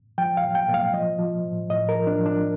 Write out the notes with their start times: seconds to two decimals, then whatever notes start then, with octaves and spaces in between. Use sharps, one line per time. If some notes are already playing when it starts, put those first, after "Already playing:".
0.18 F3 G5
0.37 F5
0.44 A#2
0.55 G5
0.69 A#2
0.74 F5
0.94 F3 D#5
1.19 F3
1.45 A2
1.70 A2 D#5
1.89 A#4
1.95 F3
2.07 D4
2.21 F3
2.26 D4